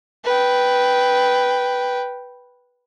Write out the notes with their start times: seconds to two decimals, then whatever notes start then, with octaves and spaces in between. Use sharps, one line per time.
0.25 B4 G5